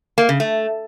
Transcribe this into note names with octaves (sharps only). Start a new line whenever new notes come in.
A#3
C#3
A3